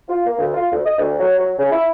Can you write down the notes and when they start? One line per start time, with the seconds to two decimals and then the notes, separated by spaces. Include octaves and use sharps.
0.09 F4
0.26 A#3
0.38 D2
0.54 F4
0.72 D2
0.86 D#5
0.99 D2
1.19 F#3
1.39 F#3
1.59 C#3
1.71 E4